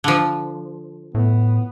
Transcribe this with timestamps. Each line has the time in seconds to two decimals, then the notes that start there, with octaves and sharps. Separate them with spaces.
0.04 D3 F3
1.15 A2 B3